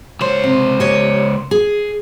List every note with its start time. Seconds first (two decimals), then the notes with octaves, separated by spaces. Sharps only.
0.21 C#2 C5 C#5
0.44 C3
0.80 G4 C#5 D#5
1.51 G#4